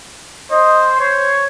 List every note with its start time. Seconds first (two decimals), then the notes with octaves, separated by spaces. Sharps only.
0.51 C5 D#5
1.00 C5 C#5